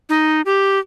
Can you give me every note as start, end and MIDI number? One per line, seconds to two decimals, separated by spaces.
0.09 0.41 63
0.46 0.79 67